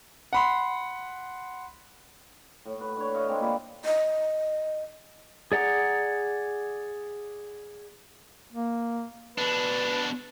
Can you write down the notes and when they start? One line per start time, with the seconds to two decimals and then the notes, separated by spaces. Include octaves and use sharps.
0.33 F#5 B5 C6
2.66 A2
2.80 F#4 B4
2.96 D4 C#5
3.13 C#5 D#5 F5 F#5
3.28 G#3 A#3 C4 D4
3.41 A#2 E4 B4 D5
3.85 D#5
5.52 G#4 D5 F#5 A#5
8.52 A#3
9.38 B2 D4 B4